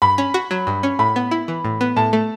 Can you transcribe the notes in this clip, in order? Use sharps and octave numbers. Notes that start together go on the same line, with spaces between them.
G2 B5
C#4
F#4
F#3
G2
C#4
A2 B5
B3
E4
E3
A2
B3
A2 A5
A3